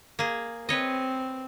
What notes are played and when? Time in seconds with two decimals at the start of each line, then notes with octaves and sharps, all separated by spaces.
0.19 A#3 G#4
0.69 C4 B4 C#5 D#5